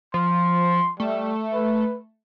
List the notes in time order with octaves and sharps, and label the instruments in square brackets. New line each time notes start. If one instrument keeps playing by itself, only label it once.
[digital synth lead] F3 [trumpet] C6
[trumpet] G3 [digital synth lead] A3
[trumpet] B4